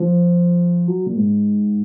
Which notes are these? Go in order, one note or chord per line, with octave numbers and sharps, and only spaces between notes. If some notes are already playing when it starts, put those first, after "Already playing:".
Already playing: F3
F#3
A#2
G#2